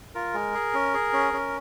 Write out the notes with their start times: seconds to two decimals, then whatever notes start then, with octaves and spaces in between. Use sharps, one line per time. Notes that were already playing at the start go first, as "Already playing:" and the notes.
0.15 F4 A#4
0.34 G#3
0.54 G#4
0.74 C#4
0.94 G#4
1.13 C#4
1.33 C#4